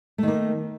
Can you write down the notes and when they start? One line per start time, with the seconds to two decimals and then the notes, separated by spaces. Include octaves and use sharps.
0.18 A3
0.23 D#3
0.28 A#3